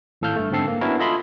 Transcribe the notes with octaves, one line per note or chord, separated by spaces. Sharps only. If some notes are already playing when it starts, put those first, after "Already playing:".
G#1 A2 A4 F5 F6 G6
G2 A3
G1 G#2 D3 C4 A4 C7
A#3
B3 C#4 D4 E4 F#4 A#4
F4 A4 D#5 E5 B5 C6